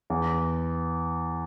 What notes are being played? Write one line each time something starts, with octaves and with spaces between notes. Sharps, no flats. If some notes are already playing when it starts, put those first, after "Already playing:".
E2